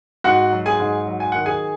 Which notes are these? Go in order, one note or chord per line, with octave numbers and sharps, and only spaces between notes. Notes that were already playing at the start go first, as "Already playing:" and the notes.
G#2 F#4 F#5
F#3
G#4 G#5
G#2
F#3
G#5
D#3 F#5
G#4 G#5